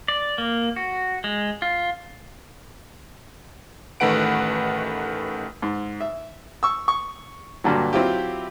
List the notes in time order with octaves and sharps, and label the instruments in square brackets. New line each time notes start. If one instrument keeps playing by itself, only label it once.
[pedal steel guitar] D5
A#3
F#4
G#3
F4
[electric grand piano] A1 D#3 A3 B4 F#5 D7
[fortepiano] G#2
E5
C#6 E6
C#6
G2 A#2 D3 F#3
F#3 C4 E4 F4 G4